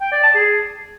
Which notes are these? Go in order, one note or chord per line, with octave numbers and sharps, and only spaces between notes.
G5
D5
A5
G#4